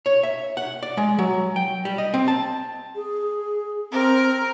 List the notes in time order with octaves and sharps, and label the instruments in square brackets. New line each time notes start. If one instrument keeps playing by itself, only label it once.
[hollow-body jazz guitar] C#5
E5
F#5
D5
G#3
F#3
G5
G3
D#5
C4
A5
[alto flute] G#4
[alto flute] C4 [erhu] A#4